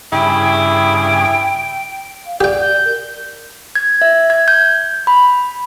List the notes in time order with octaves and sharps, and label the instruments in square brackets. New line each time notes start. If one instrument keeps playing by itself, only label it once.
[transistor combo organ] G2 C#3 G#4 [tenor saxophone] E4 [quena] G5
[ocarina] F5
[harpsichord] G4 G5 [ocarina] D5
[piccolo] G6
[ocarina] A#4
[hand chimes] G#6
E5
G#6
G6
B5